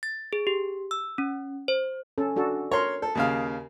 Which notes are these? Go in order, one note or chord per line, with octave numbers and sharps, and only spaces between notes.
A6
G#4
G4
E6
C#4
C5
C#4 A4
D4 F#4 A4
A#4 C#5 C6
A4
D#2 C#3 F5